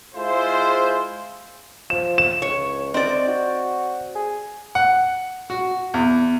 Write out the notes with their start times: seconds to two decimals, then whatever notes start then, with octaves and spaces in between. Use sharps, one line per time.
0.15 G#3 E4 F4 G#4 C5
1.90 F3 E7
2.18 E7
2.42 C#2 C#5
2.94 C4 D#4 D5
3.27 F#4
4.15 G#4
4.75 F#5
5.50 F#4
5.94 E2